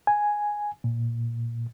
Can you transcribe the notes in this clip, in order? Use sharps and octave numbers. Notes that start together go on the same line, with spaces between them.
G#5
A#2